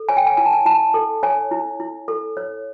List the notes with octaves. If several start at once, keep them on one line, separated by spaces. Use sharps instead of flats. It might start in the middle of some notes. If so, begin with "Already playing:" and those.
Already playing: A4
C#5 G#5
G5
G#5
E4 G#5
A5
G#5
E4 A5
A4
C#5 G#5
E4
E4
A4
C#5